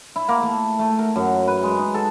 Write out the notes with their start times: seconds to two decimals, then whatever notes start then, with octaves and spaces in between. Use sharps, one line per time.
0.16 E4
0.28 A#3
0.43 A3
0.79 A3
0.99 A#4
1.16 F#2
1.48 B4
1.63 G#3
1.77 D#4
1.94 A4